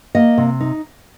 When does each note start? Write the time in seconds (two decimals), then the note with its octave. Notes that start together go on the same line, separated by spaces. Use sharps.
0.15 A#3 D#5
0.38 C3
0.60 D#4